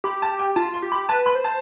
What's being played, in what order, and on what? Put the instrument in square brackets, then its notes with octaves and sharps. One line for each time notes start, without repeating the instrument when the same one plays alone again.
[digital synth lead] G4 [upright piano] B5
[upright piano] A5
G5
[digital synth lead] F4 [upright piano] A5
[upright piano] C6
[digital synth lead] G4
[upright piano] B5
[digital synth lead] B4 [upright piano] A5
[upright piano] B5
[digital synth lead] C5
[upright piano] A5